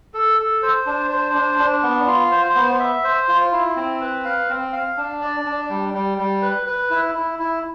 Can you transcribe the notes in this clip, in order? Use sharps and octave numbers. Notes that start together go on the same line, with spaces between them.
A4
A4
C5
D4
C5
D4
D4
B3
F4
C5
B3
E5
C5
F4
E4
C4
B4
F5
C4
F5
D4
D5
D4
G3
G3
G3
B4
B4
E4
E4
E4